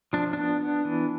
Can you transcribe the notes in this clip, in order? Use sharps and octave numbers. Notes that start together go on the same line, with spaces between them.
F3 D4
B3 D4
B3
E3